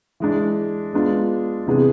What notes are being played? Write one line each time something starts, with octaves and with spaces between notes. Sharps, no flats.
E3 G#3 D4
G#3 B3 D4 F4
C3 E3 B3 D4 G#4